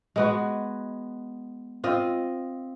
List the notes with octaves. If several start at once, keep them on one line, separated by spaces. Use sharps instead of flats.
G#3 B3 F#4
C4 F4 D#5